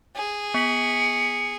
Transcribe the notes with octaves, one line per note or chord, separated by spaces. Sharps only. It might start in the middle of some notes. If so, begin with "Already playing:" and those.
G#4
B3 B6 C#7 F#7